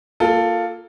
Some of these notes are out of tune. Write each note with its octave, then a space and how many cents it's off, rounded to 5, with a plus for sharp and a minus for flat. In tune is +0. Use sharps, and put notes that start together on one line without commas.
A#3 +0 F4 +0 A4 +10